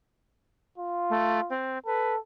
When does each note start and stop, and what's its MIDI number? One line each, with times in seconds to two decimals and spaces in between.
0.78 1.52 65
1.10 1.40 57
1.50 1.79 60
1.86 2.18 69
1.86 2.14 71